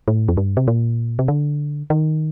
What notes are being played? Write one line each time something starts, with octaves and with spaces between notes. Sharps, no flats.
A2
F2
G2
C3
A#2
C3
D3
D#3